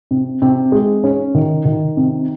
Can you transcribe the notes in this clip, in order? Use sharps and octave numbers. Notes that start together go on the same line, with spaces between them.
C3
C3
G#3
C#4
D#3
D#3
C3